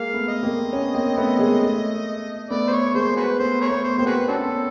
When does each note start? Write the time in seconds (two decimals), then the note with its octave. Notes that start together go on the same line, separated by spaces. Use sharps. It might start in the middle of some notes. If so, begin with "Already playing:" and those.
Already playing: G#3 A#3 F5
0.13 A3 B3
0.28 D#5
0.43 A#3 C4
0.72 B3 C#4
0.94 A#3 C4
1.17 A3 B3
1.39 G#3 A#3
1.62 A3
2.50 A3 B3 D5
2.67 C5
2.73 C#5
2.94 G#3 A#3 C5
3.16 F#4 G#4 B4
3.39 A3 B3 C5
3.61 G#4 A#4 C#5
3.69 A3 B3
3.84 C5
3.98 A#3 C4 C5
4.06 F#4 G#4 B4
4.28 B3 C#4 D4 F#4 A4